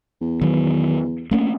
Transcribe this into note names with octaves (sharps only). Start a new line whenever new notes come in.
E2
D#3 F#3
A3 A#3 C#4